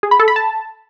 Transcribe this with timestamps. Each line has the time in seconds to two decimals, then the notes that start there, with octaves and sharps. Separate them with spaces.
0.03 G#4
0.11 B5
0.20 A4
0.28 B5
0.36 A5